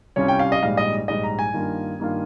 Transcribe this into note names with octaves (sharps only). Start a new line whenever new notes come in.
C2 C3 G3 C#4 F4 C#5
G5
F5
D#5
A#1 G#2 G3 F5
D#5
A#1 G#2 G3 D#5
A#5
G#5
G2 D#3 A#3 F4
G2 D#3 A#3 F4